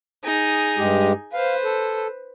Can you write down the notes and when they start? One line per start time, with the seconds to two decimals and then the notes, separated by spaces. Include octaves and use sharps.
0.24 D#4 G#4
0.78 G2 G#3 G4
1.33 B4 C5 F5
1.64 A4